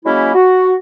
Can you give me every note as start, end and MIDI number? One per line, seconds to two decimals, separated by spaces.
0.05 0.33 54
0.05 0.33 56
0.05 0.33 58
0.05 0.33 61
0.05 0.33 64
0.34 0.74 66